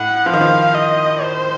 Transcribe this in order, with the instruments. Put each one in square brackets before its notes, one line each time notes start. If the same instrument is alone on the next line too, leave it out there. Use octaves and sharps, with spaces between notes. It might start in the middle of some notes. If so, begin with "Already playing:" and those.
Already playing: [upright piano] A2 [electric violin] F#5
[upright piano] F3 [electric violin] F5
[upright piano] D#3
F3
[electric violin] D#5
C5